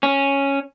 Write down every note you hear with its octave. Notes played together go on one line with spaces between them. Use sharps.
C#4